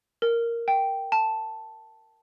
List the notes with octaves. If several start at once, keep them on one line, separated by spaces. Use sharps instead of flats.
A#4
G5
A5